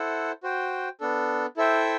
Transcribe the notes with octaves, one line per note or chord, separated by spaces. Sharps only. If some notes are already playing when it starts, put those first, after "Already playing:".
Already playing: E4 A4 C5 F#5
F#4 C5 G5
B3 D4 A4
E4 A4 C5 E5 G5